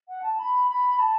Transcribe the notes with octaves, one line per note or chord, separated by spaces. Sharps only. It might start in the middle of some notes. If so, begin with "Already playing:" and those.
F#5
A5
B5
B5
A5